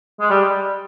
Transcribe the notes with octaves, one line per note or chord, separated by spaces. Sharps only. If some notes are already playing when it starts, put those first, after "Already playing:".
G#3
G3